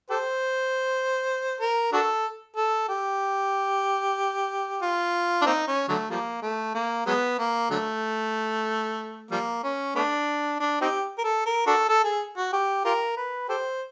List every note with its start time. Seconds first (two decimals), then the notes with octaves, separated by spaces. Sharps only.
0.10 G4 A4 C5
1.61 A#4
1.93 D4 F#4 A4
2.57 A4
2.89 G4
4.82 F4
5.41 D4
5.46 A#3 C4 D#4
5.67 C#4
5.89 D3 F#3 A3
6.11 F3 G3 A#3
6.42 A3
6.75 A#3
7.06 F#3 G#3 B3
7.39 A#3
7.70 D3 F#3 A3
9.31 F3 G3 A#3
9.64 C#4
9.95 A3 B3 D4
10.60 D4
10.81 C4 D#4 G4
11.18 A#4
11.24 A4
11.46 A#4
11.67 D4 F#4 A4
11.89 A4
12.04 G#4
12.37 F#4
12.53 G4
12.85 F4 G4 A#4
13.17 B4
13.49 G4 A4 C5